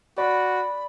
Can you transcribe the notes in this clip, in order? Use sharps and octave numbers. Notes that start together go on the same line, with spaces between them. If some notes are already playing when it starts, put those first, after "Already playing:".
F#4 D5 B5